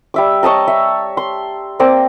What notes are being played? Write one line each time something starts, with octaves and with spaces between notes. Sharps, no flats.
G3 E5 D6
C#5 D#5 A5 A#5
E5
C6
A#3 C4 D5 A#5